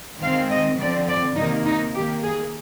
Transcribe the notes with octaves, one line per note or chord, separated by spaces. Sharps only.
D#3 G#3 C4 F5
D#5
D3 F3 C4 D5
D5
C3 D#3 A#3 D#4
D#4
D#3 A#3 G4
G#4